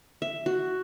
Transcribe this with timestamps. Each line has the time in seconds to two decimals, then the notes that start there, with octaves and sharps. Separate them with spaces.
0.22 E5
0.46 F#4